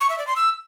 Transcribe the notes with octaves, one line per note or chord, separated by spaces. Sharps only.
C#6
E5
D5
C6
E6